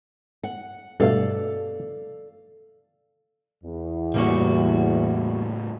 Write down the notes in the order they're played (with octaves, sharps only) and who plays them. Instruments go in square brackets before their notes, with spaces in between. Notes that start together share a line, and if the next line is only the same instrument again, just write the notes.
[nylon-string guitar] F#5
[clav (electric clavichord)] G2 B2 A3 [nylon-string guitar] A4 D5 F5
[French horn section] E2
[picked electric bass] A2 C#3 C#4 [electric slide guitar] G3 A#3 F#4